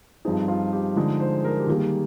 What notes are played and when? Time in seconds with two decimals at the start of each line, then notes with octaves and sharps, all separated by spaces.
0.25 G2 F3 C4 D#4 G#4
0.48 F4
0.73 G4
0.96 D3 F3 G#3 D#4 G#4
1.20 C5
1.45 A#4
1.60 G4
1.67 D#3 G3 A#3 G#4